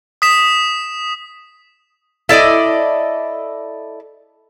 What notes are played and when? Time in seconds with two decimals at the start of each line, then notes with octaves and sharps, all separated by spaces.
0.22 D#6 B6 E7
2.29 E4 A4 D5 D#5